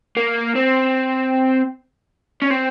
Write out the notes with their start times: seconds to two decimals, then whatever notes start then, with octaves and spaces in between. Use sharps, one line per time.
0.17 A#3
0.56 C4
2.42 C#4
2.50 C4